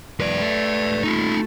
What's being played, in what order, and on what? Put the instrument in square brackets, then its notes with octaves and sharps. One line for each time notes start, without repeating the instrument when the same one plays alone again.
[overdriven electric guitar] C2 F2 [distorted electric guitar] B4 D5
[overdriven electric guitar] A3
[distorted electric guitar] D#4 F4